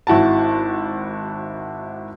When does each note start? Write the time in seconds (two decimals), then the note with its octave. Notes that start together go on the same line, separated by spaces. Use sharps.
0.07 G#1 E4 F#4 A5